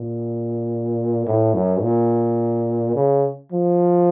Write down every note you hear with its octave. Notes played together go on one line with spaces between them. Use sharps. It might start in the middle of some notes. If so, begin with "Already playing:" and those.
Already playing: A#2
A2
F#2
A#2
C#3
F3